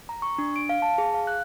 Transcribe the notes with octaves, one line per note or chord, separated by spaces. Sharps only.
A#5
C#6
D4
D7
F5
A5
G#4
F5
F#6